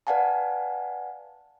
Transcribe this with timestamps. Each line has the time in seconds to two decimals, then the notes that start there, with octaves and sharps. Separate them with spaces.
0.07 B4 D5 F5 F#5 G#5 A5